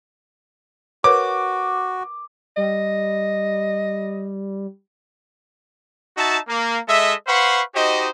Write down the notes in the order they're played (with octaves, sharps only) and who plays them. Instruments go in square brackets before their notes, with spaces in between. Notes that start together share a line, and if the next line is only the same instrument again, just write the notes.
[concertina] F#4 [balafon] A#4 B4 C#5 [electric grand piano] D6
[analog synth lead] G3 [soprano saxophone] D#5
[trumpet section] D#4 F#4 E5 A5
A#3
G#3 A4 D#5 E5
B4 C5 F5 F#5 B5 C#6
D#4 F#4 G4 C5 D#5